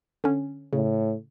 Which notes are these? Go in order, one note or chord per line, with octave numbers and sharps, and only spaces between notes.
D3 C#4
A2 C#3